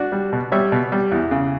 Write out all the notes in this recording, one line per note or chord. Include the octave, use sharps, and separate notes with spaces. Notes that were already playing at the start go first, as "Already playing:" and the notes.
Already playing: D4 F#4
G3
B2
G3 C#5 E5
B2
G3
E2
C#3